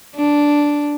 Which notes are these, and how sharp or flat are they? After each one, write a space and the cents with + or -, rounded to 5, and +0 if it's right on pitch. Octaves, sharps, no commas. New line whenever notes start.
D4 -5